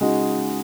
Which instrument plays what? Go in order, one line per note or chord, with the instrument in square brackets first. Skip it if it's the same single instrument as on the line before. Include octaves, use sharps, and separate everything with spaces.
[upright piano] C#3 G#3 D#4 F#4